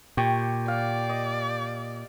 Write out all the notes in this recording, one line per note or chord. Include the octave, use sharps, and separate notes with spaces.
A#2 G4 C#6
D5 F5
D#5